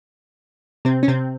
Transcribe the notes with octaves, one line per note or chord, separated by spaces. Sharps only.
C3 C4
C#4
C3 C4